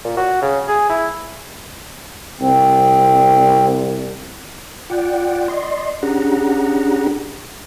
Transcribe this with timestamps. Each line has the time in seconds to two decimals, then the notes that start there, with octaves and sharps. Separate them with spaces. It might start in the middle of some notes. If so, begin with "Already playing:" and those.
0.04 A#2
0.17 F#4
0.42 C#3
0.68 G#4
0.90 E4
2.41 C2 C4
4.90 F4 D5 F#5 G5
5.48 D5 D#5 C6
6.03 C#4 D4 G4 G#4 F#5 A#5